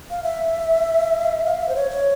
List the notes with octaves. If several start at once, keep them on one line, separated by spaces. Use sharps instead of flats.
F5
E5
F5
E5
C5
C#5
C#5